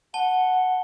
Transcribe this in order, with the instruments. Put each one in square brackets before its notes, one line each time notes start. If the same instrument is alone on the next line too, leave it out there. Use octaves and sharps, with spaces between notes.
[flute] F#5 [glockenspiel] A5 G7